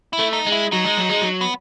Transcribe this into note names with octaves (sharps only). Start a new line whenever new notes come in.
E4
A3
D#4
G#3
E4
F#3 D#4
G#3
F#3
G#3
F#3
B3